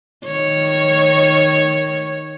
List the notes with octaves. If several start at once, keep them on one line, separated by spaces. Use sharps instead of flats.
D#3 C#5